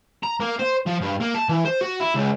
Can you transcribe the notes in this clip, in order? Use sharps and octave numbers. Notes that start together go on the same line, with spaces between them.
A#5
A#3
C5
F3
G2
A#3
A5
E3
C5
F#4
E4
C#2